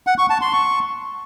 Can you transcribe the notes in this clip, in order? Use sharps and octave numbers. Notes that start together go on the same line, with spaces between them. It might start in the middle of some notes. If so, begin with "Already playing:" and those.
F#5
C#6
A5
C6
C#6